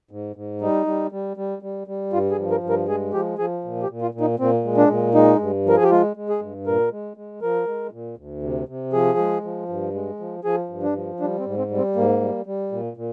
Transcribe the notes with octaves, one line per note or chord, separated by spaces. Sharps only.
G#2
G#2
G3 D#4
G3
G3
G3
G3
G3
G2 F4
G#4
F3
A#4
G2
A#4
G#3 G#4
F3 G4
F3 G#4
A#2
G4
A#2
F4
A#2
D#4
A#2 C4
G#3
D4
A#2
G#3 D#4
G2
F3 A#4
G#4
G4
G#3 F4
G#3
G#4
G2
A#2 A#4
G#3
G#3
F3 A#4
G#3
A#2
D2
C3
C3
F3 G#4
G#3
F3
G2
G#3
F3
F3 G#4
G2
D4
F3
G3 D4
C4
G#2
C4
G3
C4
G#2 A#3
G3
G3
A#2
A#2